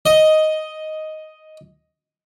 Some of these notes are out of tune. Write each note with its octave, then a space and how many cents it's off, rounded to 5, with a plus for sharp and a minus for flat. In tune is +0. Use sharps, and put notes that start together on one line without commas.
D#5 +5